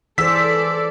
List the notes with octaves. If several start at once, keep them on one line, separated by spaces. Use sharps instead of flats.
E3 G#4 A4 C5 D5 E6 B6